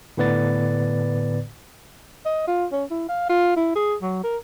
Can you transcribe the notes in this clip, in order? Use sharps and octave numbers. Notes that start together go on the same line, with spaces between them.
A2 D3 B3 B4 D5 A6
D#5
F4
C#4
E4
F5
F4
E4
G#4
F#3
A#4